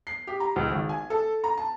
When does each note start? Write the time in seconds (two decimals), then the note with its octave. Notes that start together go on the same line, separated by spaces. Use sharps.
0.07 C7
0.27 G4
0.40 A#5
0.56 C#2
0.71 G#1
0.89 G#5
1.10 A4
1.44 A#5
1.57 A5